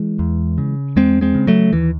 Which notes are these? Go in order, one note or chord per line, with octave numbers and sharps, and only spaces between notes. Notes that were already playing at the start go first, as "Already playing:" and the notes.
Already playing: E3 G#3
E2
C#3
E2 G#3 C4
G#3 C4
C#3
F#3 A3
D#2 E3